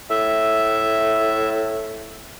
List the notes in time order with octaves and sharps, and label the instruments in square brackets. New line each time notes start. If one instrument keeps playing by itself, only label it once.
[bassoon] A2 [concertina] E5